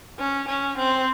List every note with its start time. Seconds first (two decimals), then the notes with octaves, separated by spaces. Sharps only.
0.19 C#4
0.48 C#4
0.77 C4